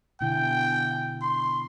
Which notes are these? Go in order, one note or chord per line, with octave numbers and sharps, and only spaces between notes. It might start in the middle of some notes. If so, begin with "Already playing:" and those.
B2 D3 E4 G5
C6